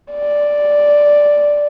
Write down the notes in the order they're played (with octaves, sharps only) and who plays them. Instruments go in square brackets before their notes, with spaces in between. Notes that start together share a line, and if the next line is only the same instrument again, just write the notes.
[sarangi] D5